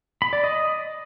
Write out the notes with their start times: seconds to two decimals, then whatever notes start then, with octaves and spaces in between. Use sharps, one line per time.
0.22 B5
0.33 D5
0.44 D#5